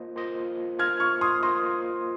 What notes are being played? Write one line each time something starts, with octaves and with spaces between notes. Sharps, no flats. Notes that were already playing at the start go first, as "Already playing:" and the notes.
Already playing: A#3 F4 C5 D#5
A#3 F4 C5 D#5
A#3 F4 C5 D#5 F6 G#6
C#6 F6
C6 D#6
A#3 F4 C5 D#5 C6 D#6